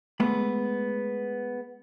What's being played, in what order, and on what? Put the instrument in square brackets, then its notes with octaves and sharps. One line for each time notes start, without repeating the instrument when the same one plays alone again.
[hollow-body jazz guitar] G#3 A3 B3 B5